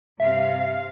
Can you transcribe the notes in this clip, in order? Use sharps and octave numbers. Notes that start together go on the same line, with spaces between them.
G2 C3 E5 F5